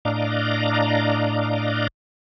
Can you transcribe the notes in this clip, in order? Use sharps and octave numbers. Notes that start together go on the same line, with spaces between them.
A2 D4 D5 D#5 F5 A#5